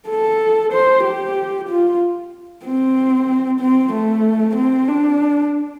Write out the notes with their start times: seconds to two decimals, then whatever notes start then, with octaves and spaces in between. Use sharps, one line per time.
0.09 A4
0.73 C5
1.04 G4
1.68 F4
2.65 C4
3.60 C4
3.93 A3
4.56 C4
4.88 D4